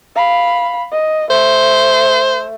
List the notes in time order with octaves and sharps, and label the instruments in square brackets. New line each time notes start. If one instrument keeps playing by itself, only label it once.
[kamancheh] F5 B5
D#5
[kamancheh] A3 [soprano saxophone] C5